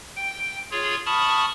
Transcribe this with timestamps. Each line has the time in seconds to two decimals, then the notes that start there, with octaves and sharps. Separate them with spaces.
0.16 G5
0.71 F4 G#4 C#5
1.06 A5 B5 C#6 D#6 F6